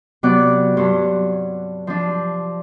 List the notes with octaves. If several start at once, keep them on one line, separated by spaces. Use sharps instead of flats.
C3 F#3 B3 D5 D6 F#6
G2 F#3 C5
F3 D4